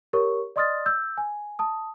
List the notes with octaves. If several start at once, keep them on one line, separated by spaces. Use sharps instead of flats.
G4 A#4 C#5 C#6
D5 D#5 C6 D#6 F6 A6
E6 G6
G#5
A5 D#6